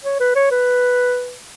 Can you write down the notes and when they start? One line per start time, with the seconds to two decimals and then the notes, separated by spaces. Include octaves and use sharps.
0.04 C#5
0.20 B4
0.35 C#5
0.51 B4